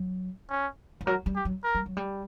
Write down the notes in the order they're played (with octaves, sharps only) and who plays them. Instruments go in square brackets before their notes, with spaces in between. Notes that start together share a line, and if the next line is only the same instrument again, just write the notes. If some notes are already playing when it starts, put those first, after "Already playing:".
Already playing: [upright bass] F#3
[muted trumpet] C#4
[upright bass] E3
[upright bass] F#3 [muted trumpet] A#4
[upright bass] G3
[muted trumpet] G4
[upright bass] F#3
[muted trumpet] A#4
[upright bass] G3
F#3
G3